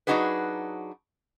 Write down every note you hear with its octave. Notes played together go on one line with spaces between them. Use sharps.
F#3 D4 D#4 F#4 G#4 B4